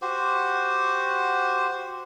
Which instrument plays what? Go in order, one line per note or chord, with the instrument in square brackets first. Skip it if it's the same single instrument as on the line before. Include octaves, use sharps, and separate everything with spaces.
[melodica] F#4 G4 C5